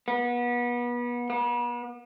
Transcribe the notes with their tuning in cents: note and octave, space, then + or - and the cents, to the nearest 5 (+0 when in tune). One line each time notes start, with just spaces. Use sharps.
B3 -30
B3 -40